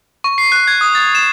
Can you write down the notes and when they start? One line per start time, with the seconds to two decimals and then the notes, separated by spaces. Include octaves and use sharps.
0.24 C#6
0.38 C7
0.52 F#6
0.67 G#6
0.81 D#6
0.95 A6
1.15 E7